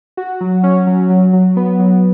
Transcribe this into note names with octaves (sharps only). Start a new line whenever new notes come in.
F#4
F#3
C#4
F#3
F#3
F#3
B3
F#3